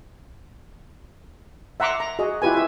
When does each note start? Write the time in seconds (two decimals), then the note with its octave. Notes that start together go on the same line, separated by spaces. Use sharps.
1.80 E5 F#5 A#5 C6 D6
2.00 A#5
2.19 F#4 G#4 D#5
2.42 E4 F4 G4 B4 G#5
2.53 E5 G#5